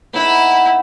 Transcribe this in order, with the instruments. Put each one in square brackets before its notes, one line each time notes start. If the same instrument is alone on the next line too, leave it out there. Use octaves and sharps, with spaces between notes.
[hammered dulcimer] B3 D#4 F#5 [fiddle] E4